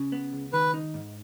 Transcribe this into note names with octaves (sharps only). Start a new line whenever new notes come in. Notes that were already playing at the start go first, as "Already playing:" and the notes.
Already playing: C#3
B3
C#2
D#3 B4
D#4
G#2